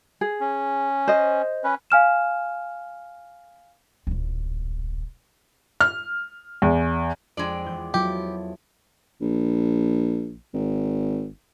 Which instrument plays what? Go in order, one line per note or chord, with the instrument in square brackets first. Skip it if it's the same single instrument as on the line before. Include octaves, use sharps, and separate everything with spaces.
[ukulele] G#4
[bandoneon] C#4
[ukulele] C5 D#5
[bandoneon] C#4 B4
[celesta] F5 G#5 F6 E7
[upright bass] D1 A#1
[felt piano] F6
E2
[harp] F2 [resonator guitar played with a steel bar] G#3 D4 D5
[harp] E2 G6
[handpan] F#3 F4 [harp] B3 E4 A4 [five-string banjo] G4
[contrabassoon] A#1
G#1